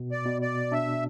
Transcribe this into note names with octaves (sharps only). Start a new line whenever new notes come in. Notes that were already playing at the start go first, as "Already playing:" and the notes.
Already playing: B2
D5
B2
D5
D4 E5